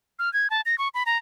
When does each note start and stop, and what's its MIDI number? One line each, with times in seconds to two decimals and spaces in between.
0.19 0.32 89
0.33 0.50 92
0.50 0.61 81
0.66 0.78 94
0.78 0.88 85
0.94 1.03 83
1.06 1.18 82